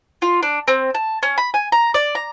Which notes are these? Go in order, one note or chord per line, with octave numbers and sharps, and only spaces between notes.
F4
D4
C4
A5
C#4
B5
G#5
A#5
D5
A#5